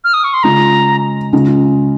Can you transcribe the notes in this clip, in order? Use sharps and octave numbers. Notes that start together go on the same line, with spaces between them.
F6
D#6
C#6
C6
C#3 G#3 C#4 F4 A#5
C#3 G#3 C#4 F4